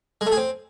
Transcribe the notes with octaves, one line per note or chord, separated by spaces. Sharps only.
G#3
A3
G#4
C4